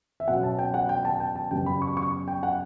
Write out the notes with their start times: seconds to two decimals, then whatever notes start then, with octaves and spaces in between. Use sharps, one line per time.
0.20 E5
0.28 B2 F#3 C#4 F#5
0.43 A5
0.59 G5
0.74 F#5
0.89 G5
1.05 A5
1.20 G5
1.36 A5
1.51 F#2 C#3 G3 B3 G5
1.66 B5
1.82 C#6
1.97 C#6
2.28 G5
2.43 F#5